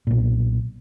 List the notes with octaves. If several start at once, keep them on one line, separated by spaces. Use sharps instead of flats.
B1 A#2